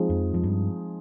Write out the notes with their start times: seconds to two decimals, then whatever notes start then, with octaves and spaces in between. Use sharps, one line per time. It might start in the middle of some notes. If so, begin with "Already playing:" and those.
Already playing: F3 G#3 C4 D#4 G#4
0.10 F2
0.34 F2
0.44 G2